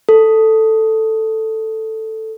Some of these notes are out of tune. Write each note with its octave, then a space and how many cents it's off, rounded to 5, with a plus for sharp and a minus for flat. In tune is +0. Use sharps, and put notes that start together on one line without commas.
A4 +5